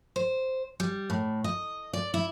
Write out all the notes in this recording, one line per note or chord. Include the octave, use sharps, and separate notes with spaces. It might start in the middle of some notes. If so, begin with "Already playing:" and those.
C5
G3
A2
D#5
D5
E4